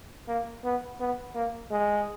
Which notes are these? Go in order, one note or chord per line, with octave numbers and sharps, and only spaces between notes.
A#3
B3
B3
A#3
G#3